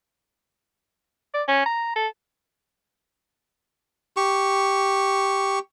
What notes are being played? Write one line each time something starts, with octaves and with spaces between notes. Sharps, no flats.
D5
C#4
A#5
A4
G4 C#6